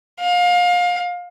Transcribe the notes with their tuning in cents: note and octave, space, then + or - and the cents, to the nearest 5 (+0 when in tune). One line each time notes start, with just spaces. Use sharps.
F5 +30